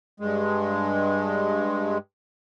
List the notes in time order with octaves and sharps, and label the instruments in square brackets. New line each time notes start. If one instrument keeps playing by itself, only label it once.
[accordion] G2 G#3